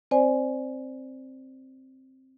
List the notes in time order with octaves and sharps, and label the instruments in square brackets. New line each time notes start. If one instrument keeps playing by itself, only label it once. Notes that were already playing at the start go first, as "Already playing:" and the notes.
[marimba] C4 C5 D5 G#5